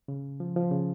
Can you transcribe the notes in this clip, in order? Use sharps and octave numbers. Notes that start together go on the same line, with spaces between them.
C#3
F3
F3
C#3